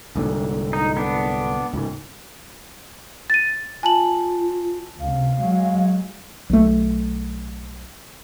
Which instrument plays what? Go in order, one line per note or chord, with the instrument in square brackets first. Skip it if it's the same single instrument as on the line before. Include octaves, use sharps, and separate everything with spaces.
[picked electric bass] C2 G#2 D3
[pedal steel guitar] D#4
B3 D4
[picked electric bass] C#2 G#2
[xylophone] A6 D#7
[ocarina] F4 [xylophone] G#5 A5 F#7
[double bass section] C#2 C3 [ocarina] F5
[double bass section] F#3 G#3
[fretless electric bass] B1 A3